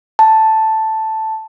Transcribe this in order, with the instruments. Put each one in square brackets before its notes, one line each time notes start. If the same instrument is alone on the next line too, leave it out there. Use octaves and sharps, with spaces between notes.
[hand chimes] A5